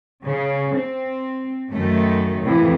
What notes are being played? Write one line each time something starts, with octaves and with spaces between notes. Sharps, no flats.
C#3
C4
F#2 D#3 A3
F2 A2 C3 E3